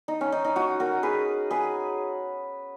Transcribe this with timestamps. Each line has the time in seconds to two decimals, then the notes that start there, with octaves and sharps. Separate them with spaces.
0.08 D#4
0.21 C#4
0.32 D#4
0.44 D#4
0.56 D#4 F#4
0.80 F#4 A#4
1.03 G#4 B4
1.51 G#4 B4